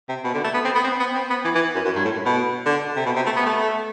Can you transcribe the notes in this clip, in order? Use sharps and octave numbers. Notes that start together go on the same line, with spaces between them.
C3
B2
D3
A3
B3
C4
B3
C4
B3
C4
B3
E3
E3
F#2
F#2
G2
A2
B2
D3
C3
B2
C3
A3
B3
A3